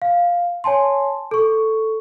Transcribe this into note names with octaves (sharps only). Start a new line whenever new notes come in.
F5
C#5 G#5 A5 C6
A4 C#6